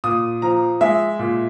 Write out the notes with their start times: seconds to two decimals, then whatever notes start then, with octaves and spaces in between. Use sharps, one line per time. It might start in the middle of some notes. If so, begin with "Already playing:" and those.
0.04 A#2 D#6
0.42 F3 A#5
0.81 G#3 E5
1.19 A#2